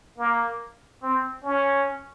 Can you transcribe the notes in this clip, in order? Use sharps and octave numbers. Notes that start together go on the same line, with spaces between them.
A#3
C4
C#4